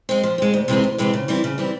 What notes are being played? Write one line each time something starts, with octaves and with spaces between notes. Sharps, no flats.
G#3 C4
F3
G#3 C4
D2
C3 E3 G#3 C4
D2
C3 E3 G#3 C4
C#3
E3 G3 C4 E4
C#3
E3 G3 C4 E4